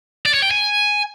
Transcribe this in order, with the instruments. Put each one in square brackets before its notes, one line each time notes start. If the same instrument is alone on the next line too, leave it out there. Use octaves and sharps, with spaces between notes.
[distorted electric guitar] D5
C#5
G5
G#5